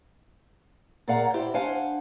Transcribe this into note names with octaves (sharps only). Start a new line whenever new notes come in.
A#2 G#4 D5 F5 F#5 A#5
E4 G4 C5
D4 C5 F5 F#5 G#5